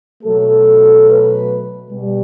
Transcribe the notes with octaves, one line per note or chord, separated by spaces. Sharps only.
B2 F#3 A3 A4
B4
B2 G3